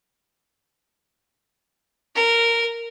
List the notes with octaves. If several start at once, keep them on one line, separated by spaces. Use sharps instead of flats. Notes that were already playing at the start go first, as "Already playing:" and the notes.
A#4